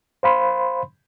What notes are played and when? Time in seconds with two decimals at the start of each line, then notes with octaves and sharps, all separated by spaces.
0.23 C5 F5 B5 C6